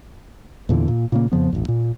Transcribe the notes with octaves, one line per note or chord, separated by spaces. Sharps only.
E2 A#2 D3 E3
A#2
A#2 C#3 A#3
F2 C#3 F3 B3
E1 A1 E2
A#2